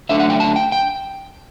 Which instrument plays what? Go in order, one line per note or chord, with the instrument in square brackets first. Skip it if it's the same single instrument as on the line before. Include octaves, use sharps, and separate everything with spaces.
[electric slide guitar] D3 F#3 A3 D4 E5
F#5
G5
A5
G5
G5